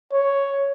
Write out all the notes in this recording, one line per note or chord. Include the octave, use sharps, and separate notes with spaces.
C#5